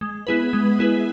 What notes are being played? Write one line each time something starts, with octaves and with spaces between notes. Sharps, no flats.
G#3
B3 E4 G#4 B4
G#3
B3 E4 G#4 B4